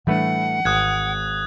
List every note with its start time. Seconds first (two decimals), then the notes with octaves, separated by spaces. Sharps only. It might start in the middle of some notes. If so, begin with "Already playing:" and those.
0.07 A2 E3 G3 A3 D4 B4 F#5
0.65 G#1 D#6 F#6 G#6